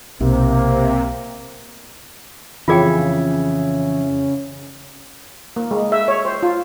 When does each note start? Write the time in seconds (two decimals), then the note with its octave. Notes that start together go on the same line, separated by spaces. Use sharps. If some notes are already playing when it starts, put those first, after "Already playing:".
0.20 B1 C3 A#3 C4
2.68 F2 C#3 E3 F4 G#4 E5 G5 G#6
5.56 A#3
5.71 G#3
5.92 E5
6.08 C#5
6.25 C5
6.43 F4